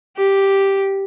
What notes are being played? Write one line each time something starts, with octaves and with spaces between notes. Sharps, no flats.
G4